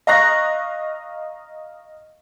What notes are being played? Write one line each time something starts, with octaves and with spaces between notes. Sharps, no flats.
D#5 F5 A#5 C#6 F#6 A#6